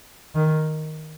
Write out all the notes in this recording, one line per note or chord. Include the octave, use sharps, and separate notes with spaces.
D#3